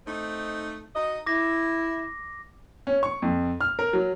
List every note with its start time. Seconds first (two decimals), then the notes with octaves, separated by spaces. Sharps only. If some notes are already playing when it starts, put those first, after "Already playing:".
0.06 A3 C4 D#4
0.95 D#4 F#4 D#5
1.26 E4 D6 A#6
2.87 C#4
3.03 C#6
3.22 F2
3.61 F6
3.79 A#4
3.93 F#3